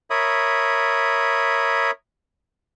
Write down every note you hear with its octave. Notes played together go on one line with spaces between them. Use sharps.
A#4 C#5 E5 B5 D#6